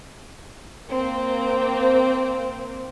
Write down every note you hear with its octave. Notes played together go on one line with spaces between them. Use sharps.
A#3 C4